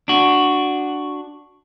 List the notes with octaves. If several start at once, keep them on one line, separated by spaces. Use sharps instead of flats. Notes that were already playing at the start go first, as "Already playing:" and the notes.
D4 F#4